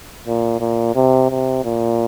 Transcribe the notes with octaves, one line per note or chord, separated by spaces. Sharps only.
A#2
A#2
C3
C3
A#2